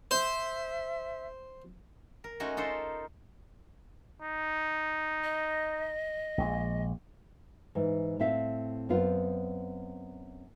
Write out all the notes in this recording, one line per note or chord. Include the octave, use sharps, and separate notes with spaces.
C5 E5
A#4
G#3 A3 C#4 D#4 F#4
D#4 F4 A4 A#4 C5
D#4
D#5
A#1 G#3
G#2 E3
A2 C4 E5 F5
F#2 B3 C4 F4